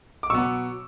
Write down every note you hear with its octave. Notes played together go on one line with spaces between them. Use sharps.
D6
B2 F#3 B3 C#6 E6